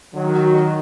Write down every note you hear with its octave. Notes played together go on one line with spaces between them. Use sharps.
D#3 F#3
F#4
D#5